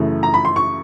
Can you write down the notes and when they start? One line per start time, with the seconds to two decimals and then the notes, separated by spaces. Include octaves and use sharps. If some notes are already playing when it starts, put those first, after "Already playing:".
Already playing: F#2 C#3 E3 A3
0.23 A#5
0.34 B5
0.45 C6
0.56 C#6